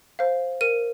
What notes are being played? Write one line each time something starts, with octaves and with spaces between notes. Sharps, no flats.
C5 F5
A#4 D#7